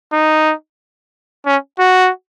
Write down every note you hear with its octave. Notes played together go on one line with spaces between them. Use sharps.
D#4
C#4
F#4